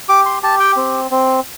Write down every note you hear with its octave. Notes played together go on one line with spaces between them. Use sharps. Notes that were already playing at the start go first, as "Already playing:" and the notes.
G4 D6
C6
G4 A5
G5
C4
C4